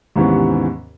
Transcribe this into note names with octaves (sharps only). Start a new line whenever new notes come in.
D#2 G#2 C3 E3 B3 C#4